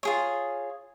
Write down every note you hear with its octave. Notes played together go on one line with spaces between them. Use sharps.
F4 G#4 C#5